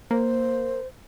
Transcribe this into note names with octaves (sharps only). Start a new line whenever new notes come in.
A#3 C5